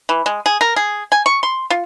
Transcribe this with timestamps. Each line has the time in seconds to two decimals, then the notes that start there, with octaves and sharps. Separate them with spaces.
0.09 E3
0.26 G#3
0.46 G#4
0.61 A#4
0.76 G#4
1.12 G#5
1.26 C#6
1.43 C6
1.70 F4